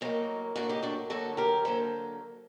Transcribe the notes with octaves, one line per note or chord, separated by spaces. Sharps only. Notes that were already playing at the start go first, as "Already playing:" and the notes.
A2 F#3 A#3 C4 D#4
A2 F#3 A#3 D4 F#4
D#4 G4
D4 F#4
D2 D3 F#3 A#3 F#4 A4
G4 A#4
D3 F#3 A#3 A4 C5